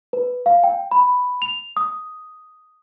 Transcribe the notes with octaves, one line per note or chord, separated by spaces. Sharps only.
B4
F5
G5
B5
F7
D#6